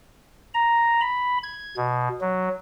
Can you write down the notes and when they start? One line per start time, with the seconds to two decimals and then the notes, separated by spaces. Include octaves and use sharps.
0.54 A#5
1.01 B5
1.43 G#6
1.77 B2
2.21 F#3